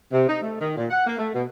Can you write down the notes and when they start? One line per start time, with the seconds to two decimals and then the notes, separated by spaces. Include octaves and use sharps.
0.12 C3
0.29 D#4
0.42 A3
0.61 D#3
0.77 A#2
0.91 F#5
1.07 A#3
1.19 A3
1.34 B2